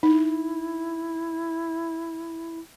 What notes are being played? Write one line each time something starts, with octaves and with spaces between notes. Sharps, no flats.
D#4 E4